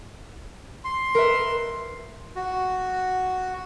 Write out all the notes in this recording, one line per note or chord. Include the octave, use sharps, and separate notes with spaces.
C6
A#4 B4 E5
F#4